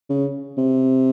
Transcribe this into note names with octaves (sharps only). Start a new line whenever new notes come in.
C#3
C3